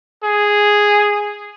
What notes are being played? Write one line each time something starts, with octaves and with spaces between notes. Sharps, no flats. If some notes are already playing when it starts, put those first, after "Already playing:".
G#4